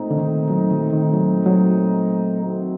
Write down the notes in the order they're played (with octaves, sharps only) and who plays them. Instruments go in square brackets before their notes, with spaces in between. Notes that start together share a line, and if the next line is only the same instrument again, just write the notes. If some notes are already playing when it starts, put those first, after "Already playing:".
Already playing: [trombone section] A#2 A3 C4 D#4
[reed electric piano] D3
D#3
F#3
D#3
D#3
F#3
F#3
[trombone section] D#3 A3 C4 F#4